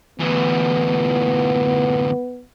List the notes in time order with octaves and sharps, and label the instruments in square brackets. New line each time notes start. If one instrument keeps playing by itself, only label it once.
[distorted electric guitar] D2 E3 [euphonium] B3